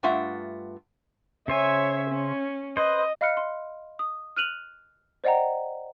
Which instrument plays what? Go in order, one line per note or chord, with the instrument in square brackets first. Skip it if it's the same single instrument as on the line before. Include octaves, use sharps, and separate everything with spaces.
[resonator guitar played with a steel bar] G2 A3 F4 E5 F#5
[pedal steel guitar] C#3 C5 G#5 [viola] C#5 E5
[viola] C#4
[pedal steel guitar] B4 C5 [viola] D#5
[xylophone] D#5 F5 B5 F6 F#6 C#7
C6
D#6
F6 F#6 D#7 F7 F#7
C5 D5 D#5 F#5 G5 A#5